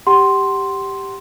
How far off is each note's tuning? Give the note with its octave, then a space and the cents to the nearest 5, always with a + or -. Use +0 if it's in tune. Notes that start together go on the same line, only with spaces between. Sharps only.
G4 +0 F#5 +35 C6 +0